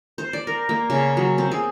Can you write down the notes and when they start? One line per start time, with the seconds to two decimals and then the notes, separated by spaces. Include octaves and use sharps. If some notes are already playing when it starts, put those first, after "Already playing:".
0.18 C5
0.33 D5
0.47 A#4
0.69 A#3
0.90 C#3
1.17 F#3
1.38 C4
1.52 G#4